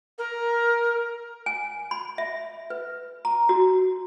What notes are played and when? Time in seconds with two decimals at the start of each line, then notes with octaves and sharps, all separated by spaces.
0.18 A#4
1.46 G#5
1.91 B5
2.18 E5
2.70 B4
3.25 A#5
3.49 F#4